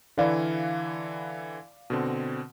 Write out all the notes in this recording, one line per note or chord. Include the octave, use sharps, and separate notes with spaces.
D3 E3 E4 D5 F5
B2 D3 C4